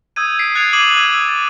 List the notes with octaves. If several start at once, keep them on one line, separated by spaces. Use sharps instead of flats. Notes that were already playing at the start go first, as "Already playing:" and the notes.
D#6 E6 G6 G#6 D#7
B6 C7 D7
F#6 G#6 A6 C7 C#7 F7
D6 D#6 D#7 E7 F#7
E6 G#6 D#7 F#7
A6